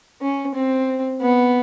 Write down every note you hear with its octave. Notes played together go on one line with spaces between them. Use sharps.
C#4
C4
B3